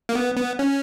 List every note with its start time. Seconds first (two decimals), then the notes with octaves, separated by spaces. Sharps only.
0.09 A#3
0.15 B3
0.37 B3
0.59 C#4